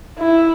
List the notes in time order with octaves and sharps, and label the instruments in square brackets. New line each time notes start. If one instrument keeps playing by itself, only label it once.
[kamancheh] E4